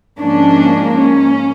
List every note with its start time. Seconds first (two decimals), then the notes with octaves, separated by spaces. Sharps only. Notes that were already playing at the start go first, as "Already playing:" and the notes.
0.19 G#2 F3 A#3 C#4 D4
0.94 C#4